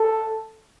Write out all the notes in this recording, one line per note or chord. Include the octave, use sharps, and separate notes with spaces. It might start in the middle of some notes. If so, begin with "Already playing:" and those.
Already playing: A4